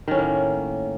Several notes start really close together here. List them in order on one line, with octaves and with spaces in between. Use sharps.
D#3 C#4 A2 A#3